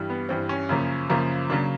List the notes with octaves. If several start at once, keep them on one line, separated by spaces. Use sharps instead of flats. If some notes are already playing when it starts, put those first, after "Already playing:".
Already playing: G2 E3 G3
B3
G2 E3 G3 C4
C#4
F#2 C#3 F3 A#3
F#2 C#3 F3 A#3
C#3 F#3 A#3 D4